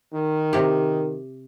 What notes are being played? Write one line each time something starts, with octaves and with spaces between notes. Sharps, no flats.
D#3
C3 G4